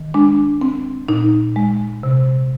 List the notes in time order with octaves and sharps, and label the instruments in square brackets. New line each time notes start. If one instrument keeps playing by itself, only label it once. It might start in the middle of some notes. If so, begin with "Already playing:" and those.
Already playing: [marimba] D#3
G#3 D4
C4
A#2 D#4
G#3
C3